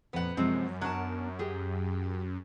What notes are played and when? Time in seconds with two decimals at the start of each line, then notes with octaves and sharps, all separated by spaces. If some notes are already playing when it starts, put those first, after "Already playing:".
0.13 F2 A#2 B3 F#5
0.37 F#2 C3 F3 G#3 C4
0.81 F#3 B3 D4 A#4 A5
1.39 G4 G#4